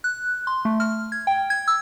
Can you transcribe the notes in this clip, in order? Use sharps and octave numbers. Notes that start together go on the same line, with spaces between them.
F#6
C6
A3
F6
G#6
G5
G#6
E6